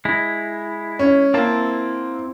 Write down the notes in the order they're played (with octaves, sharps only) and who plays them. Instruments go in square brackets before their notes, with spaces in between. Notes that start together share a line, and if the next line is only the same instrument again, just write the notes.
[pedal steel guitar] G#3 E4
[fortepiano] C#4
[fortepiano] A#3 [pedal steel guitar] C4 E4 A5